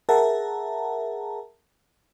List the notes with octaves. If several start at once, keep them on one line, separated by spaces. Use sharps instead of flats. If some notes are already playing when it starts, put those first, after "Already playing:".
G#4 A#4 E5 F#5 A5 A#5